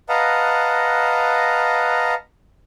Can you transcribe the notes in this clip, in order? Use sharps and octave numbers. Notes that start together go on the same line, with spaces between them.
B4 D#5 F5 F#5 A5 A#5